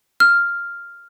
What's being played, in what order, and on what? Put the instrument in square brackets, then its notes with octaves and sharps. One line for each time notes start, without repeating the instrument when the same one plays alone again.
[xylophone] F6